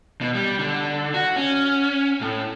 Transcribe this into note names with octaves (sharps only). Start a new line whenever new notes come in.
B2
G3
D3
F#4
C#4
A2